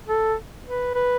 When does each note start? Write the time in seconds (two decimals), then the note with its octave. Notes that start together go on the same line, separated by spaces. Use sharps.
0.08 A4
0.66 B4
0.95 B4